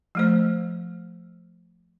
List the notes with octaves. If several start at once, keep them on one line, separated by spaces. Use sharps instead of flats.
F3 A3 C5